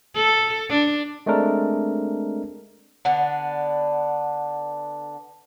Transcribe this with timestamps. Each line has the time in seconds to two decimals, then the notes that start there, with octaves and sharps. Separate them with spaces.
0.15 A4
0.69 D4
1.26 G#3 A3 C4 D4 A#4
3.05 D3 B3 D4